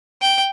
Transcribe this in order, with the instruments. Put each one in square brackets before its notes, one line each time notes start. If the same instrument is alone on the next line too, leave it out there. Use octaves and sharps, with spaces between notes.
[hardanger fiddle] G5